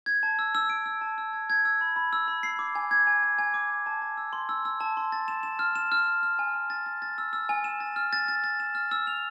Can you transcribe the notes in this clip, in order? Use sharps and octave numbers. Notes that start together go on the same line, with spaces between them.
G#6
A5
E6
E6
D7
E6
A5
E6
G#6
G#6
E6
B5
B5
E6
B5
C7
D6
G#5
G#6
G#5
G#5
G#5
D6
G#5
A5
A5
E6
C6
E6
E6
A5
C6
A6
E7
E7
F6
E7
F6
E7
F6
G#5
G#5
A6
A6
A6
E6
E6
G#5
E7
A6
F6
A6
A6
A6
E7
F6
E6
F7